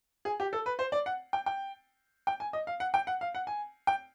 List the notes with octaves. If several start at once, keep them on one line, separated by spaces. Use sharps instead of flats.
G#4
G4
A4
B4
C5
D5
F#5
G5
G5
G5
G#5
D#5
F5
F#5
G5
F#5
F5
F#5
G#5
G5